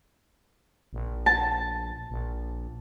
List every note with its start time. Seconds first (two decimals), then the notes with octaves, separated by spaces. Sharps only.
0.93 A#1
1.26 A5
2.10 A#1